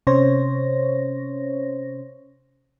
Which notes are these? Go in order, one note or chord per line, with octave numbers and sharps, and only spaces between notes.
C3 C#4 C5 C#5 A#6